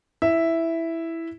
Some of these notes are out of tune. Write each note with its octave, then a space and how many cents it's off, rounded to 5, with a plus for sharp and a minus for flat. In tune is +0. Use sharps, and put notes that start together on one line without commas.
E4 +0 E5 +0